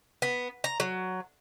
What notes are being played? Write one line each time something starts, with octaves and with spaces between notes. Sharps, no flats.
B3
A#5
F#3